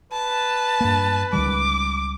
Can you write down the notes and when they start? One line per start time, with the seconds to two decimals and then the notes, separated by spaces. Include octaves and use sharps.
0.12 B4 A5
0.81 G2 A#3
1.33 C#2 D#3 G3 D6